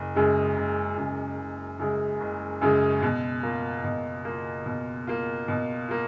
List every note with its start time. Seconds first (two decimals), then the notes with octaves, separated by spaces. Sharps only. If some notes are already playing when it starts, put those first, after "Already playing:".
Already playing: F#1
0.16 F#2 C#3 G#3
0.56 F#1
0.97 F#2 C#3 G#3
1.39 F#1
1.79 F#2 C#3 G#3
2.20 F#1
2.61 F#2 C#3 G#3
3.02 B2
3.43 A#3 F4
3.84 B2
4.25 A#3 F4
4.66 B2
5.07 A#3 F4
5.48 B2
5.89 A#3 F4